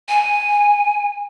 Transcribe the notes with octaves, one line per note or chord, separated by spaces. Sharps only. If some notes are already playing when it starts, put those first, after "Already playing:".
G#5